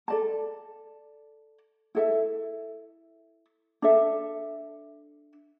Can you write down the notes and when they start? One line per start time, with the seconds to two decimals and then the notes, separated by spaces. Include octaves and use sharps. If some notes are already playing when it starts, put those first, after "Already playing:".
0.08 A4 D5 A5
1.95 E4 A4 E5
3.82 D4 A4 E5